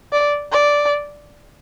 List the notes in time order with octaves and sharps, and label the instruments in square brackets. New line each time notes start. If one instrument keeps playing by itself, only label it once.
[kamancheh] D5
D5